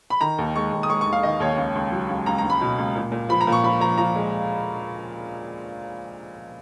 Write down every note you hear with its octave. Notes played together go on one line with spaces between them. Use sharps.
B5
D#3 A#5
D#2
G#3 C#6
D#2
D#6
G#3 C#6
C#6
D#2
F5
D#3 D#5
D#2 C#5
C#2
C#2
F#3
C#2
C#2 A#5
A#5
C#2
B5
B2
C#2
A#2
A#2
F3 B5
A#5
A#2
C#6
F3 B5
F3 A#5
F3 A#5
G#3